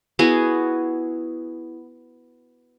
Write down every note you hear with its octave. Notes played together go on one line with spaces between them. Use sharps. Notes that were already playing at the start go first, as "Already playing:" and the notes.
B3 E4 F#4 G#4